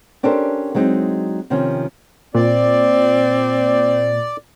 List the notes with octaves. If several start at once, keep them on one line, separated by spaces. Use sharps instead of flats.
C#4 D4 G4 A4 A#4 C5
F#3 G#3 C4 D#4
C3 D#3 F3 C#4
A#2 C4 D5